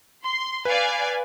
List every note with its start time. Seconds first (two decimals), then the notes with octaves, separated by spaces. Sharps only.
0.22 C6
0.65 B4 D5 F5 G#5